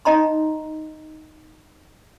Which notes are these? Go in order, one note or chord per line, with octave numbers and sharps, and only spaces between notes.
D#4 D#5 A#5 C6